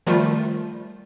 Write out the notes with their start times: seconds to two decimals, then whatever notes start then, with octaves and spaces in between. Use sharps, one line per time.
0.07 D#3 F3 G3 A3 F4